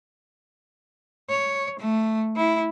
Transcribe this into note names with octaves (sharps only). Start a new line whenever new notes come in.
C#5
A3
E4